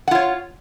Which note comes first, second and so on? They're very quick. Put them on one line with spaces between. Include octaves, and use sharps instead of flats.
F#5 F4 C#5